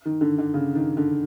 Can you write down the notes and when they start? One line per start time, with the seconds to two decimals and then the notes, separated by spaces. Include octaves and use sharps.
0.05 D#3
0.21 D3
0.38 D3
0.54 C#3
0.75 D#3
0.97 D3